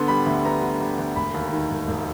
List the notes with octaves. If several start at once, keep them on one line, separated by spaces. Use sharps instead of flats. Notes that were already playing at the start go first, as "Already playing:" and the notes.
Already playing: D3 B3 C6
G3 B5
D2
B3 A#5
D3
G3
D2
E1 B5
D#2
D#3
E1
E1